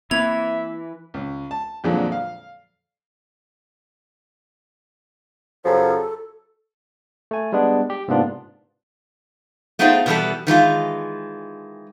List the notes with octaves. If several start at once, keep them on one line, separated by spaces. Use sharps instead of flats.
E3 A#3 C4 B4 E5 G#6 F7
C#2
A5
F2 A#2 D3 F3 F#3 G#3
F5
F#2 C#3 F3 A4
A3 G#5
G3 G#3 B3 D4
G4
G#2 C3 A#3 B3 D4 F4
A3 B3 D#4 F4 G#4 C5
B2 D#3 E3 G3 B3 A4
D#3 E3 G#3 F4